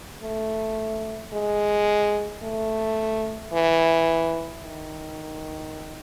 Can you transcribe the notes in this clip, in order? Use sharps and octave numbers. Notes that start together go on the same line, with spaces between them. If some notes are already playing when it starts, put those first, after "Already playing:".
A3
G#3
A3
E3
D#3